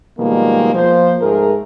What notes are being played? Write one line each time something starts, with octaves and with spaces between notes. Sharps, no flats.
B2 D#3 F3 G3 G#3 A#3
F3 A#3 C5
G#2 A3 G#4 A#4